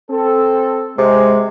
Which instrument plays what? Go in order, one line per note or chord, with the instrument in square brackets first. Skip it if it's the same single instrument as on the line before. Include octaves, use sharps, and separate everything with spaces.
[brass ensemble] C4 A4
[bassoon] C3 [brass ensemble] G#3